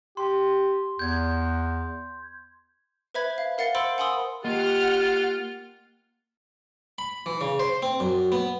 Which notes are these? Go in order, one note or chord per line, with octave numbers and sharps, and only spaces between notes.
G4 C6
E2 G6 G#6
B4 C5 E5 B5 G#6
F5
A#4 F5 F#5 A6 C#7
C5 B5 C6 E6 D7
F#5 G#5 B5 C6 D#6 E6
A#3 F4 G4 D#5 F#5 F6
B5
E3
C#3
C5
C4
F#2
B3